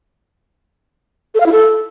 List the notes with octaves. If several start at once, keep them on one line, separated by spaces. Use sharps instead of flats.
A4
F5
E4
A4